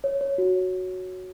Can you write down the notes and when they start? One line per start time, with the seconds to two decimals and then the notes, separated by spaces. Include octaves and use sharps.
0.04 C#5
0.21 C#5
0.38 F#4
0.55 C#5